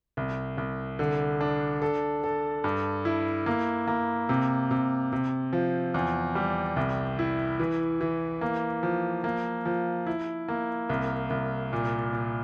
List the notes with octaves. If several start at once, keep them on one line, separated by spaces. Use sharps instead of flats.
C2
C2
D3
D4
A4
A4
G2
E4
A#3
A#3
C3
C3
C3
F3
E2
G3
C2
E4
E3
E3
A#3
F3
A#3
F3
E4
A#3
C2
C2
A#2
A#2